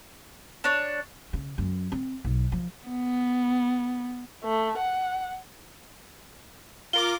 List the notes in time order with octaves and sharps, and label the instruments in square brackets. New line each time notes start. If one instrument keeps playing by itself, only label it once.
[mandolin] D4 C#5
[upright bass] C#3
F#2
C4
B1
F3
[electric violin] B3
[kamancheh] A3
F#5
[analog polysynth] F4 A#4 D6 [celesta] G7